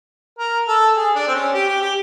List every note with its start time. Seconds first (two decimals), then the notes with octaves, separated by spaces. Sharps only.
0.39 A#4
0.68 A4
0.96 G#4
1.15 D4
1.28 C4
1.34 C#4
1.53 G4
1.67 G4
1.81 G4